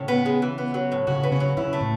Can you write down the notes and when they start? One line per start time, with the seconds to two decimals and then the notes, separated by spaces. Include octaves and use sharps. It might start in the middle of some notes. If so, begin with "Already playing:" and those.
Already playing: A2 C#3 C#4
0.08 B3
0.26 G#3
0.42 E3
0.58 B3
0.74 F#3
0.92 A2
1.07 C#3 C#4 F#4
1.23 B3
1.32 C#3 C#4
1.40 F#3
1.57 C#3 C#4 E4
1.73 A3
1.81 A2